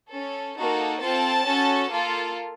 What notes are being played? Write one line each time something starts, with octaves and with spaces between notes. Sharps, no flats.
C#4 A4
A#3 D#4 F#4 A4
C4 F4 A4 A5
C#4 F#4 A4
A#3 F4 A4